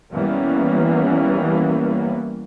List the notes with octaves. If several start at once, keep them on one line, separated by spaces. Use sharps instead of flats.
E3 G3 A#3 B3 C#4